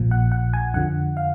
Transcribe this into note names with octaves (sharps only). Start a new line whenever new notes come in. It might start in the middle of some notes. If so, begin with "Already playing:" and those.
Already playing: A#1 A#2 F3
F#5
F#5
G#5
F2 D3 F3 F#5
F5